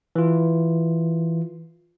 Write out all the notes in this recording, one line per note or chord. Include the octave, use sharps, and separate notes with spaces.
E3 F4